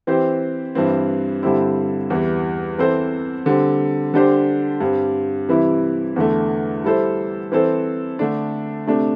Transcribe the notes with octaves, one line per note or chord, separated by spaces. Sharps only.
E3 C4 G4 C5
G2 E3 C4
G2 D3 G3 C4 E4
E2 E3 G3
E3 C4 A4 C5
D3 G3 C4
D3 G3 D4 G4 C5
G2 G3 C4
C3 E3 G3 E4
E2 D3 A3
G3 E4 A4 C5
E3 C4 A4 C5
D3 A3 D4
C3 A3 D4